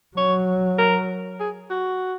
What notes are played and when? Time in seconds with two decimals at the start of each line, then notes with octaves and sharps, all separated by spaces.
0.17 F#3 C#5
0.78 A#4
1.40 G#4
1.70 F#4